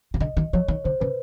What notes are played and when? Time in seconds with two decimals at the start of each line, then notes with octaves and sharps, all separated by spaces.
0.14 C#3
0.20 D3 D#5
0.37 D#3
0.53 F3 C#5
0.68 D#3
0.84 D3 C5
1.00 C#3 B4